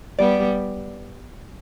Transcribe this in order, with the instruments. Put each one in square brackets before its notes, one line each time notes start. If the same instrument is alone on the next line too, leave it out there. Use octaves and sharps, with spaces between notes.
[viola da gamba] G3 B3 [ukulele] D5